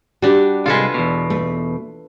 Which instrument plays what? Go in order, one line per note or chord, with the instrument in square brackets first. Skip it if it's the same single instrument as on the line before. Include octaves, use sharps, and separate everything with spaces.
[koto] G3 D4 [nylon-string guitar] F#4 G4
[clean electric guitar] C2 G#3 [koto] F4 A4 B4
[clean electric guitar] E2 B2
[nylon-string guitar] A3